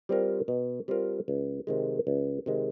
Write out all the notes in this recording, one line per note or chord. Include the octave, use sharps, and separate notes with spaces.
G3 C4 F4 A#4
B2
G3 C4 F4 A#4
C#2
C3 D#3 G#3
C#2
C3 D#3 G#3